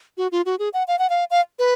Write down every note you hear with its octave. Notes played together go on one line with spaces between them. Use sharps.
F#4
F4
F#4
G#4
F#5
F5
F#5
F5
F5
B4